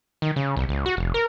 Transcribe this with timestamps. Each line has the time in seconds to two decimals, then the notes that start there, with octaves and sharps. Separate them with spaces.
0.22 D#3
0.36 C#3
0.57 C2
0.69 C#2
0.86 F#4
0.97 F1
1.14 A#4